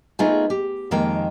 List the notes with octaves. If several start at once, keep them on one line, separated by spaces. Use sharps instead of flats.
A3 B3 D#4 F4 G#4
G4
F2 D#3 G#3 A#3 G5 A#5